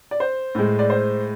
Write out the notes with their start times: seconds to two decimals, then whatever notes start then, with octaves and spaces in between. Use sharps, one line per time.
0.11 D5
0.20 C5
0.55 A2 G#3
0.79 D5
0.90 C5